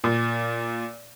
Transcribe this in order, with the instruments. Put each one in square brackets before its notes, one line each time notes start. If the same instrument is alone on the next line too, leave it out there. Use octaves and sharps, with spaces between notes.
[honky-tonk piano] A#2